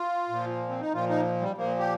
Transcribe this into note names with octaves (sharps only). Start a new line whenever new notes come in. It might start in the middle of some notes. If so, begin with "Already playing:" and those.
Already playing: F4
A#2 F3
C4
D#4
A#2 F3 F4
D#4
G3
A#2 F3 A#3
G4